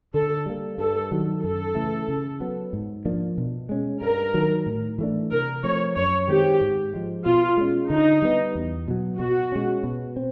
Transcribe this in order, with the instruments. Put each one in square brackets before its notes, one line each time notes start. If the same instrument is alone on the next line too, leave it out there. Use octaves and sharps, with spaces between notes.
[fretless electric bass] D3 [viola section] A4
[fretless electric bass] G3 A#3
[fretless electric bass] G2 [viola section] A4
[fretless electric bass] D#3 F#3
[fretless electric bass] F#2 [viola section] A4
[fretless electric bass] C#3 E3 A3
C#3
F#3 B3
G#2
F3 A#3 D4
B2
G#3 C#4
[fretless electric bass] G2 [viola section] A#4
[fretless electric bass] D#3 F#3
A2
E3 A3 D4
[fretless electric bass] C3 [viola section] A#4
[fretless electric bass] F3 A3 C4 [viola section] C#5
[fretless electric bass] F#2 [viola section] C#5
[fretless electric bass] D#3 G#3 C4 [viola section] G4
[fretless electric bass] G#2
F3 G#3
[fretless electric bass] B2 [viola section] F4
[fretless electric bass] G#3 C#4
[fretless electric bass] D3 [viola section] D#4
[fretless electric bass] G3 B3
E2
B2 F#3
[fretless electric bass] B2 [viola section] F#4
[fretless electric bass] G#3 C#4
B2
C4